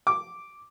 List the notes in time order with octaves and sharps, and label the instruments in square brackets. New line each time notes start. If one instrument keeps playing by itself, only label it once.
[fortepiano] D6